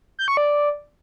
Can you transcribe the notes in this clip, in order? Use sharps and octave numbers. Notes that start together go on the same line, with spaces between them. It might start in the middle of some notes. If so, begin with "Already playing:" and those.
G6
C#6
D5